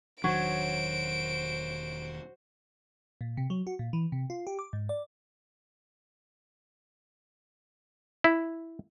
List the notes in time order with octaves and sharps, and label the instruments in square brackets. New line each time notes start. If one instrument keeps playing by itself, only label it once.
[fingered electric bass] E1 D#3 D4 [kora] F#3 C#5 [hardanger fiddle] F#4 C5 [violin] D7
[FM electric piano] A#2
C3
F#3
F#4
A#2
E3
C3
F4
G4
D6
G#2
D5
[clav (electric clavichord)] E4